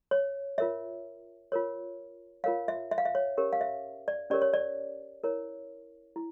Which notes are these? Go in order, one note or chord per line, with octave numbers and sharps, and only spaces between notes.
C#5
F4 A#4 C#5 E5
F4 A#4 C#5
F4 A#4 C#5 F5
E5
E5
F5
E5
C#5
C#4 G4 A#4 C#5
F5
E5
D5
C#4 G4 A#4 C#5 D5
C#5
D5
E4 A#4 C#5
E4